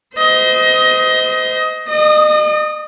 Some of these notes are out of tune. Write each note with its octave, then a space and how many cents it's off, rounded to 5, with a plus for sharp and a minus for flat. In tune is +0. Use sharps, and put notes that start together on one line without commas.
C5 -30 D#5 +20
D#5 -40 D#6 +0